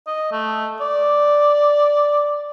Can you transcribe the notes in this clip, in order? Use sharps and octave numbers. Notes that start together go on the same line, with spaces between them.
D#5
A3
D5